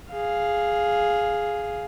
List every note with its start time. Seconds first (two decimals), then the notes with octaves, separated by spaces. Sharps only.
0.12 G#4 F5